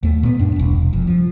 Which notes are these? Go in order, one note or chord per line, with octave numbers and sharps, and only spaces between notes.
D#2 A3
A#2 B3
F#2 D4
E1 C2
F1 F2
F3